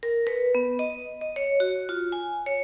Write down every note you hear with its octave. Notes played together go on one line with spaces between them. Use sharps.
A#4
B4
B3
D#5
D#5
C#5
F#4
F4
G#5
C#5